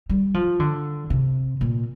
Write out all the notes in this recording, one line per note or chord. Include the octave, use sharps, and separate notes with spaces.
G3
F3
D3
C3
A#2